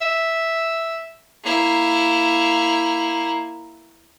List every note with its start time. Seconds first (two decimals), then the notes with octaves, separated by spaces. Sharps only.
0.01 E5
1.44 A#3 E4